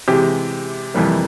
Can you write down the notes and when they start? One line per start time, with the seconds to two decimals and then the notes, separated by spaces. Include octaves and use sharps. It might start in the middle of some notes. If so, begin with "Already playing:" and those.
0.08 C3 E3 G#3 G4
0.94 F2 C3 E3 G3 A#3